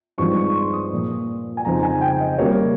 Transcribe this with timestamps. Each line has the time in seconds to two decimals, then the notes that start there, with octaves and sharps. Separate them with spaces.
0.18 G2 F3 G#3 C4 D#4 C#6
0.37 C#6
0.55 C6
0.73 D#6
0.91 A#2 F3 A#3
1.57 G#5
1.65 F2 C#3 F3 C4 D#4 A#5
1.83 G#5
2.01 G5
2.20 D#5
2.38 C#3 G3 A#3 C#5